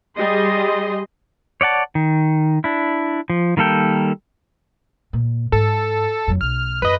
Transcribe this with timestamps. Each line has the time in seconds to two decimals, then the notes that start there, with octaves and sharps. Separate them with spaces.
0.17 G3 G#4 D#5 C6
1.61 C#5 D5 F#5 A5
1.95 D#3
2.64 D4 E4
3.30 F3
3.57 D#3 G3 A#3 A4 G5
5.13 A#2
5.52 G#2 A4
6.28 F2 F#3
6.41 B1 F6
6.82 F#2 B4 D#5